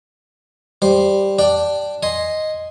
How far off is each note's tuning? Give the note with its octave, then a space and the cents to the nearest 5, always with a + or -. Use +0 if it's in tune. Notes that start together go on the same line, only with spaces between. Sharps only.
G3 +0 C5 +0
D4 +0 D5 +0 G5 +0
D#5 +0 G#5 +0 C6 +0